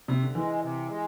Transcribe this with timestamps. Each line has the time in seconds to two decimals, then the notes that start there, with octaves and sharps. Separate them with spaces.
0.08 C3
0.22 D3
0.35 E3 G#3
0.62 C3
0.89 G#3